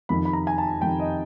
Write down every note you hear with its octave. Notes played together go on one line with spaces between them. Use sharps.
F2 C3 D#3 B5
B5
A#5
G#5
A5
F2 C3 D#3 G5
D#5